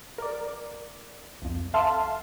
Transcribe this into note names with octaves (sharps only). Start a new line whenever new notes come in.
A#4 D5
C2 F2
A4 E5 F5 A5 C6